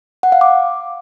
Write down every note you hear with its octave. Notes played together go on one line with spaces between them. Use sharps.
F#5
F5
D6